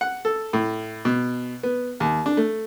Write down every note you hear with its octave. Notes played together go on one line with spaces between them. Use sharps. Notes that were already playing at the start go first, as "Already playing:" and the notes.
F#5
A4
A2
B2
B3
D#2
D4
A3